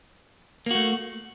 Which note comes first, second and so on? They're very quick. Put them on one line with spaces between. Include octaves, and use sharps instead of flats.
A#3 F#4 A3